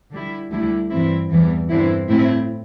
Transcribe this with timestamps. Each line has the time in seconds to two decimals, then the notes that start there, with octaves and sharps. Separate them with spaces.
0.11 D3 G3 E4
0.51 D2 D3 G3 E4
0.90 G2 E3 C4 E4
1.30 E2 E3 G3
1.69 G2 D3 C4 E4
2.08 A2 A3 C4 E4